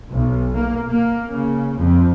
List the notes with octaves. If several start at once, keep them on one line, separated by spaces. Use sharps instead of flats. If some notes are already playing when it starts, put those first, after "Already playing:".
B1
A#3
A#3
C#3
F2